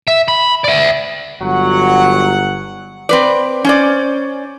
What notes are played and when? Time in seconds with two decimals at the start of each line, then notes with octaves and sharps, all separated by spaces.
0.08 E5
0.28 B5
0.64 D5 E5
1.42 G1 F#3 F#5
3.09 C4 B4 D5
3.65 C#4 C5 D5